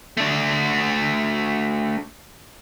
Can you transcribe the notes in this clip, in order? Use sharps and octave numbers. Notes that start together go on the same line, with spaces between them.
A3 D4